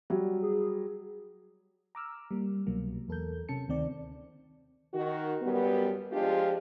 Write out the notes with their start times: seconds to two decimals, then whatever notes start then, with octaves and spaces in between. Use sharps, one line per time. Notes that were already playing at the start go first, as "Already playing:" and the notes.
0.10 F#3 G3
0.42 G#4
1.95 A#5 D6 E6 F6
2.31 G3 A#3
2.67 C2 B2 F#3 A#3
3.08 E2 A4 A#4 G6
3.49 C3 C#4 A5 C#7
3.68 D2 D#3 C4 D5
4.94 D#3 F#4
5.42 F#2 G3 B3
6.12 F3 G#3 D4 F4 G4